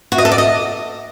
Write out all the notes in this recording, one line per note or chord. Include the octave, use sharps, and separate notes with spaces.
F#4
D#5
A4
D5
D#5